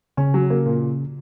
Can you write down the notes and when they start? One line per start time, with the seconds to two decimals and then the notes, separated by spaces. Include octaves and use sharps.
0.17 C#3 C#4
0.34 F#3
0.50 A#3
0.66 A#2